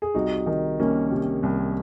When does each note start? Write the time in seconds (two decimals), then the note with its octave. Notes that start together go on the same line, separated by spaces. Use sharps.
0.02 G#4
0.14 C2 D#4 F#4
0.46 D#3
0.80 C2 A#3 C#4
1.11 C3
1.43 C2